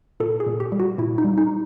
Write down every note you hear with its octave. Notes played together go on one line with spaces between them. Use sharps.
A#2 A4
G#4
A#2
G4
G3
F#4
A#2 E4
D#4
G3
D#4